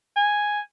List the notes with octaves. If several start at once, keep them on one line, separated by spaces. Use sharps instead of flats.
G#5